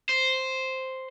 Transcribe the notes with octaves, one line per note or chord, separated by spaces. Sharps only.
C5